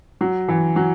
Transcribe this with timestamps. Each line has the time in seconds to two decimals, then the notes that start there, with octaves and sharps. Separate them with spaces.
0.21 F#3
0.48 E3
0.76 F#3